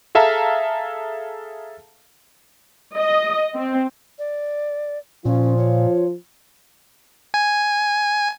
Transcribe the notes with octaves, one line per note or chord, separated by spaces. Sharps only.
G#4 A4 E5 F5 A5 A#5
D#5
C4
D5
A#2 F3 C#4 F4
C#5
G#5